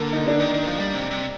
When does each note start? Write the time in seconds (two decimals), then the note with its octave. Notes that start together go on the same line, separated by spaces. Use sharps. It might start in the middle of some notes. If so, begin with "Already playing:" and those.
Already playing: D3 A#3
0.13 D#4
0.27 D4
0.40 D#3
0.54 D#3
0.67 F3
0.79 G3
0.93 C3
1.11 C3